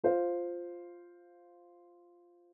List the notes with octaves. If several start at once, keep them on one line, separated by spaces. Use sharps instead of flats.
F4 C5 F5